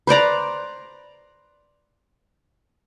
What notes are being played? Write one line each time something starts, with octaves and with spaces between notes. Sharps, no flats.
B4 C5 D5 A#5